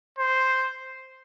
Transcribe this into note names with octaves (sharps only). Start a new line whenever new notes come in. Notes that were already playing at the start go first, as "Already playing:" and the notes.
C5